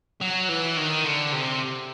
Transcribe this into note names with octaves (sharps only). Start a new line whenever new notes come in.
F#3
E3
D#3
D3
C3